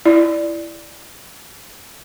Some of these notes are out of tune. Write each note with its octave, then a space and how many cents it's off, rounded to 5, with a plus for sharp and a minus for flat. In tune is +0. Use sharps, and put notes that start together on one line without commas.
E4 +10 D5 +0